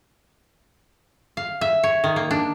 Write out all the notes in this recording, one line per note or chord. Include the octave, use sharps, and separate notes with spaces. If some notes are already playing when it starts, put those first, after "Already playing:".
F5
E5
C#5
D#3
A#3
D4